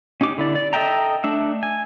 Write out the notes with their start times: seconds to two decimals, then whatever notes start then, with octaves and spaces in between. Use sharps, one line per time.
0.21 C#4 D#4 G4 D6
0.38 D3 E4 D5
0.55 D5
0.73 A4 D#5 E5 G5 A#5
1.24 A3 D4 E5
1.63 G#5